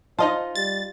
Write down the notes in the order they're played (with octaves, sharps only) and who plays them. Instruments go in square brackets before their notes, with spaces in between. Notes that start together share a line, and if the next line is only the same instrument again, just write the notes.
[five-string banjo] D#4 D#5 A5 [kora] F4 [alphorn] C5
[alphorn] G3 [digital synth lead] A6